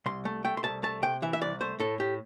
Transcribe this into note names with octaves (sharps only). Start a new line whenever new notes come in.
C2 C6
A3
A3 G5
C6
C2 A5
A3 A5
C3 G5
E3 E5
E5
C2 D5
A3 C5
A2 A4
A2 G4